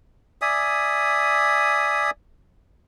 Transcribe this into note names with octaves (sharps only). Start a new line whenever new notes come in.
D5 E5 G#5 D#6